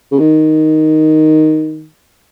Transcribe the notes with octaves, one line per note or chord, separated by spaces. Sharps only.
C#3
D#3